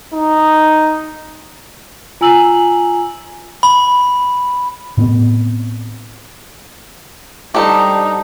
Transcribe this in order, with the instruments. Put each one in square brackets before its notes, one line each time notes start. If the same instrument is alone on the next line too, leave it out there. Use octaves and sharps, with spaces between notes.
[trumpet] D#4
[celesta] F4 G#5 A#5 E6 F#7
[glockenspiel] B5
[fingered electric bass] A2 B3 C4
[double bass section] G3 [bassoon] D4 [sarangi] D#4 [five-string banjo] G4 A4 C5